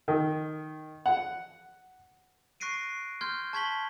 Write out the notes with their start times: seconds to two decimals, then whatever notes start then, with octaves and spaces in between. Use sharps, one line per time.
0.08 D#3
1.06 F#5
2.60 C#6 F#6 A#6 C7 D7 D#7
3.21 C6 F6 G6 G#6
3.53 A5 C#6 G#6 B6 F#7 G7